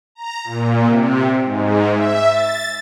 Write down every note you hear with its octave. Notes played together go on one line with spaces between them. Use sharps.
A#5
A#2
C3
G#2
E5
A6